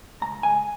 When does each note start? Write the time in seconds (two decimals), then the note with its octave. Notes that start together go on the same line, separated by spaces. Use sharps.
0.22 C#2 A#5
0.43 C#3 G#3 G#5